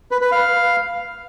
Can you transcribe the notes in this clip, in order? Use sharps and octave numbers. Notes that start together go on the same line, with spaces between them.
B4
B4
F5